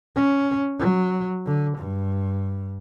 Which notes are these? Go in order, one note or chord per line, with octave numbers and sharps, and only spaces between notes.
C#4
F#3
D3
G2